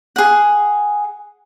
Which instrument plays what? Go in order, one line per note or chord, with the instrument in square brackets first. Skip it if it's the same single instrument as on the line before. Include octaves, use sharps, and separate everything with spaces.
[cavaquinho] G#4 F#5